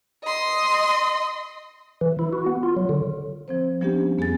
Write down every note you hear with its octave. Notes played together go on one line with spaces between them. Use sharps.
D#5 C6
E3
E4
F#4
B3
F4
F#3
D3
F3 C4 C5
F3 G3 B3 C#4 D4 G4
F2 B3 G#4 G#5 A6